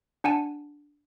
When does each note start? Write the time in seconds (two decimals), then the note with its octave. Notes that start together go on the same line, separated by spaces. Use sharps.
0.24 D4 F#5 G#5 A5